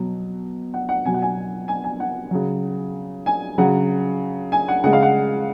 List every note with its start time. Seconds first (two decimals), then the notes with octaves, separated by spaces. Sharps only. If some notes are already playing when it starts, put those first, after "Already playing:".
Already playing: B2 F#3
0.74 F#5
0.89 F#5
1.05 B2 F#3 G#5
1.14 F#5
1.22 G#5
1.68 G#5
1.84 G#5
2.00 F#5
2.31 C#3 F#3
3.26 G#5
3.58 C#3 F#3 F#5
4.52 G#5
4.68 F#5
4.84 C#3 G#3 F#5
4.93 F5
5.03 F#5